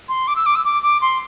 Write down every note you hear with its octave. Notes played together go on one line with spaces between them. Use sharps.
C6
D6
E6
D6
E6
D6
D6
C6